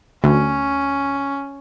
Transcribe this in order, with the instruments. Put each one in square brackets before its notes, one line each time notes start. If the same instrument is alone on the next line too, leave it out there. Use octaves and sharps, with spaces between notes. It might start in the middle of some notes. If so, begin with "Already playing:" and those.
[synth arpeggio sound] D2 [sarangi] C#4